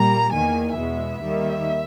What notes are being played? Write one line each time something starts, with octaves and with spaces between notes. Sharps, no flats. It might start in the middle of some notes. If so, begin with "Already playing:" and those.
Already playing: A#2 G3 A#3 A#5
E2 D#3 A#3 G#5
E2 B2 G#3 B3 E5
D#2 D#3 G3 A#3